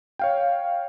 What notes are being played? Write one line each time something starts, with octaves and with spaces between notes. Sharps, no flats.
C#5 F5 G5